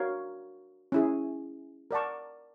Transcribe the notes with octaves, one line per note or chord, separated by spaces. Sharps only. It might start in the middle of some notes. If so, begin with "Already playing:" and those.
Already playing: D4 F#4 A#4 C#5 F5
C#4 E4 G#4
A#4 D5 F#5 A5 C#6